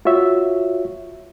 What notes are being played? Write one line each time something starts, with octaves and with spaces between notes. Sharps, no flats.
F4 F#4 C#5 E5